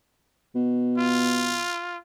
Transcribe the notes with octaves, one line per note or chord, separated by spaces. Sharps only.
B2
F4